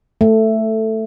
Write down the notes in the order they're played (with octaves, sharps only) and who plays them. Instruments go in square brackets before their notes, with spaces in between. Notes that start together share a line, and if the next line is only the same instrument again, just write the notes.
[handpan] A3